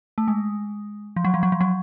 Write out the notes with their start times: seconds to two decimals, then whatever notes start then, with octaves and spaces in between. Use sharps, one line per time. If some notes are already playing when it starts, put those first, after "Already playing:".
0.18 A3
0.28 G#3
1.16 F3
1.25 F#3
1.34 F3
1.43 F#3
1.52 F3
1.61 F#3